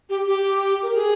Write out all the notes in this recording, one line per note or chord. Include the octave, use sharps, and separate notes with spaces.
G4
G4
A#4
G#4